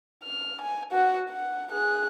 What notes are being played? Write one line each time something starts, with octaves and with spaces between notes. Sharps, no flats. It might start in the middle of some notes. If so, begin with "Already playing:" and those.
F6
G#5
F#4 F#5
F#5
G#4 F#6